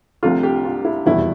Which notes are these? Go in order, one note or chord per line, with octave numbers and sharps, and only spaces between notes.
C2 C3 F3 A3 F4
G4
F4
E4
F1 E2 B2 G3 E4